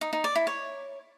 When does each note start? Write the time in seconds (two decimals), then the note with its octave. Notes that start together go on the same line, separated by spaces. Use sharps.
0.01 D#4
0.13 D#4
0.24 D5
0.35 E4
0.47 C#5